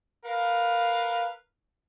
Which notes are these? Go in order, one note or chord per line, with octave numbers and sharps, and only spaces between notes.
A#4 B4 F5